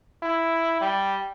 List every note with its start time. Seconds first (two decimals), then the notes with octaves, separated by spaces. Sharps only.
0.22 E4
0.81 G3